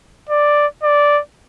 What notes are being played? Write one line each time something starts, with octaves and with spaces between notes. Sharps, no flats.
D5
D5